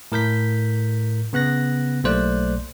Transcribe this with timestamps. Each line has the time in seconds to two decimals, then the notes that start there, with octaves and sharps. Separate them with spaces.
0.12 A2 A#4 G6 B6
1.33 C#3 B3 F#6 A#6
2.04 B1 A3 A#3 C5 D5 F#6